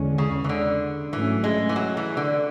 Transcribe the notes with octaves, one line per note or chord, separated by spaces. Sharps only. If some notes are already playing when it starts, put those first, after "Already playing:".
Already playing: E2 D3 G#3 C#4
C#3
E3
D3
G#2 E3 F#3 A3 C#4
G#3
E3
F#3
E3
D3